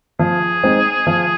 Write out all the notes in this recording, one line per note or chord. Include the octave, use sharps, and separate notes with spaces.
F3 G#4
G#3 C4 D#4
F3